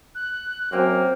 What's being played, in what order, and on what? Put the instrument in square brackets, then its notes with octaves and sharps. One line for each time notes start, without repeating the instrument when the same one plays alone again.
[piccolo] F#6
[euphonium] F#2 [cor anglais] A#3 [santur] C4 G5